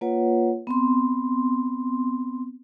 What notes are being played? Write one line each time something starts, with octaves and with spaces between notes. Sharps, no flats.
A#3 F4 B4 C#5 F#5
B3 C4 C6